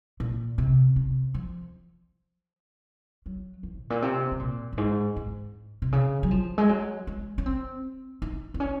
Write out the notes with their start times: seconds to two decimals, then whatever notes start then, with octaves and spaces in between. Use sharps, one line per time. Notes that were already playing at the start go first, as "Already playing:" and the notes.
0.20 A#2
0.58 C3
0.96 C3
1.34 F3
3.26 F#3
3.63 F3
3.80 G#2
3.90 A#2
4.02 C3
4.32 C3
4.39 A#2
4.73 F#2
4.78 G#2
5.16 G#2
5.82 C3
5.92 C#3
6.23 F#3
6.31 F3
6.58 G#3
6.69 F#3
7.07 G#3
7.38 C#4
7.46 C4
8.22 D#4
8.54 C4
8.60 C#4